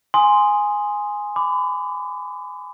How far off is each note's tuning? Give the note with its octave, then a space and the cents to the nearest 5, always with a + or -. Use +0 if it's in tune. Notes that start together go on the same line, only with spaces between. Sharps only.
G#5 +0 C6 +0 D#6 +0
B5 +35 D6 +0